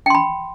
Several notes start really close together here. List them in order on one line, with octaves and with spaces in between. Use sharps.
G5 C6 B5